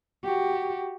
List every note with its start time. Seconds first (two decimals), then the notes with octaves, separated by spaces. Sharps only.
0.24 F#4 G4